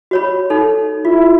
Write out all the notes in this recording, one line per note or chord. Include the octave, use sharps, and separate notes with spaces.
F#4 C#5 B5
D#4 A4
E4 F4